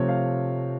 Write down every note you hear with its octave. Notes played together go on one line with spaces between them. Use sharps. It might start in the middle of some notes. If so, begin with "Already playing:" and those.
Already playing: C3 F3 A3 C4 C#5
F5